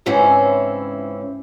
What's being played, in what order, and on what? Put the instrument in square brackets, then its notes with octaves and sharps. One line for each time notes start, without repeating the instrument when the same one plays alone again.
[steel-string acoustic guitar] G#2 C#3 E3 C4 C#4 E4